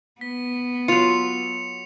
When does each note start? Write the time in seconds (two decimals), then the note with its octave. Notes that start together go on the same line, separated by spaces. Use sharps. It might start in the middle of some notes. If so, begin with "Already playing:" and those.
0.21 B3 B6
0.88 F#3 F4 C#7 F7